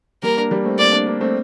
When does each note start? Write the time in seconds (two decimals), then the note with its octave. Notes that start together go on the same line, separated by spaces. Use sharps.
0.22 G3 A#3 A#4
0.37 A#3 D4
0.51 G3 A#3
0.65 A3 C4
0.78 A#3 D4 D5
0.92 A#3 D4
1.07 A#3 D4
1.20 A3 C4